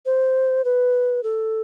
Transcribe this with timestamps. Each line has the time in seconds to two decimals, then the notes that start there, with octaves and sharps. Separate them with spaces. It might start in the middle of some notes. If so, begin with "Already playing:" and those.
0.06 C5
0.65 B4
1.23 A4